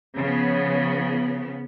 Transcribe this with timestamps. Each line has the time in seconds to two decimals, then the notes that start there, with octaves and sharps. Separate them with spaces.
0.17 C#3 F3 B3